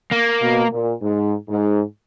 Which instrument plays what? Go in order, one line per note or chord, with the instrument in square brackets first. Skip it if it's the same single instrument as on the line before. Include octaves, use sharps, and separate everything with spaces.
[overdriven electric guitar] A#3
[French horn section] B2
A#2
G#2
G#2